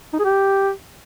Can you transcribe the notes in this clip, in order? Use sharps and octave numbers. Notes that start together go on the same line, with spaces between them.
D#4
G#4
G4